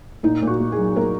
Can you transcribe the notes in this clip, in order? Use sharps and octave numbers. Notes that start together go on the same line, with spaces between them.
A#2 D#4
A#2
F#4
A#3
G#4
F#3
A#3 A#4